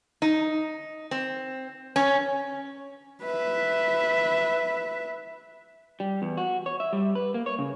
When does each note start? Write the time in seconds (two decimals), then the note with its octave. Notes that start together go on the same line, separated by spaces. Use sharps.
0.22 D#4
1.11 C4
1.96 C#4
3.23 B4 E5
6.00 G3
6.22 E2
6.37 F#4
6.66 C#5
6.80 E5
6.93 G3
7.15 B4
7.34 A#3
7.46 C#5
7.59 C#3